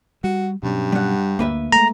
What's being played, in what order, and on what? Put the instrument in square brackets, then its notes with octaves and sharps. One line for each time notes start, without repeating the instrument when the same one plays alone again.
[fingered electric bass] G3 [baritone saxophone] F#4
[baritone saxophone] G2 [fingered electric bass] B2 F#3 C#4
[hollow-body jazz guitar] G3 F#5
[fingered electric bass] D2 [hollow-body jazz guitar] A#3 B4 E5
[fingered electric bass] G#3 A3 [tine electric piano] A#5